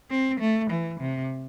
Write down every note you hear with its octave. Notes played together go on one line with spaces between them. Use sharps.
C4
A3
E3
C3